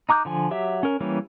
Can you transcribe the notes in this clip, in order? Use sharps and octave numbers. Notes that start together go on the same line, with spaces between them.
D#4 A#5 D6 F#6 G6
D3 F3 G#5
F#3 G4 E5
C#4 A#4
E3 G3 A#3 C#4